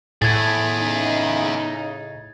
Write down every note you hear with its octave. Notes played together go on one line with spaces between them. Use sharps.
A2 E4 G#4 G#6 A6
C#3 D#4